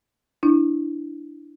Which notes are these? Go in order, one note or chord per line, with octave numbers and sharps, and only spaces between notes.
D4 E4